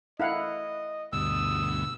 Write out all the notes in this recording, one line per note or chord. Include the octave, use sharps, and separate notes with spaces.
E4 D#5 F5 F#5
D2 G2 B2 D#6 E6